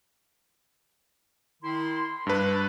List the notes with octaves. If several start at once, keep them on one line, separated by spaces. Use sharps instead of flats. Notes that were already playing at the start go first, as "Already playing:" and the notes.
D#3 E4 C6
G2 D4 B4